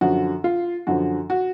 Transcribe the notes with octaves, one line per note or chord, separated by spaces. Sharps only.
F#2 D3 F3 F#4
F4
F#2 D3 F3 F#4
F#4